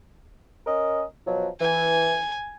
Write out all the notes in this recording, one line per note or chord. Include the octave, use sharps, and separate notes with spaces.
C#4 A#4 D#5
B2 F3 F#3
E3 G#5